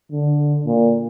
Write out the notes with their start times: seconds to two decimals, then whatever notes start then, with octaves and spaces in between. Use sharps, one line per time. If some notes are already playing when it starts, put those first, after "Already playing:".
0.12 D3
0.66 A#2